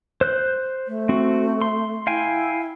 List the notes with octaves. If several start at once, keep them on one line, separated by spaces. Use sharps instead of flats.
C5 F#6 G6
A3
C4 F#4
C6
E4 F5 G5 G#5